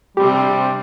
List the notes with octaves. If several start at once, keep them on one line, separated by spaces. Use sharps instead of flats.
C3 G3 C4 D4 G4